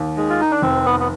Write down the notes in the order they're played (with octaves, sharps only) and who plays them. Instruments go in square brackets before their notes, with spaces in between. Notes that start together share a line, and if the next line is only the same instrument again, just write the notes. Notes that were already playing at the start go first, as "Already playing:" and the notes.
Already playing: [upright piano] D#2
[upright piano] D#3 [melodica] G#3
[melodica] F4
[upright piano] D#3 [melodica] D#4
[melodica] D4
[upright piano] F1 [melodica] C4
[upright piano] D#3 [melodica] B3
[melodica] B3